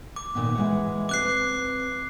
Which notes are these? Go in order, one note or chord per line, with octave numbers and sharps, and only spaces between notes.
D6
A#2 D#3 B3
E3 G#3 F#5
C4 B4 D6 F#6 C7